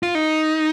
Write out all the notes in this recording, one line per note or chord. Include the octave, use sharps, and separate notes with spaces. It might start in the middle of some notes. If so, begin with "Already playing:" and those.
F4
D#4